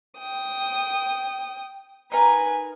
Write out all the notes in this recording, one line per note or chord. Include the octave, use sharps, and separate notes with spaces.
G5 D#6
D#4 A#4 B4 G#5